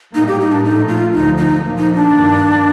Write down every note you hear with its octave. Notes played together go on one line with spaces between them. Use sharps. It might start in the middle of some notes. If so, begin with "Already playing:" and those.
A2 G3 A#3 D#4
G4
D#4
D4
A#2 F3 A3 D#4
F4
D2 D3 F3 D#4
D#4
A#2 F3 A#3
D#4
D4
G2 D#3 A#3